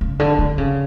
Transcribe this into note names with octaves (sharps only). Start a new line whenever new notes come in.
C#3
D3
D3
C#3